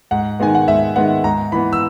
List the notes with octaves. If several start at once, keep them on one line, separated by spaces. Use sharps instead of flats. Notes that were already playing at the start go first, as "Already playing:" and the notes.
G#2 F#5
D#3 G#3 B3 G#5
F#5
G#2 E5
D#3 G#3 B3 F#5
G#2 A#5
E3 B3 B5
E6